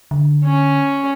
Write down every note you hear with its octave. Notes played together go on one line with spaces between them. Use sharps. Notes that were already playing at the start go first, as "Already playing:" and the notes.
D3
C#4